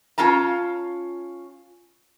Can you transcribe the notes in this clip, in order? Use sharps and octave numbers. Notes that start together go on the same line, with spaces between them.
C#4 F4 A5 A#5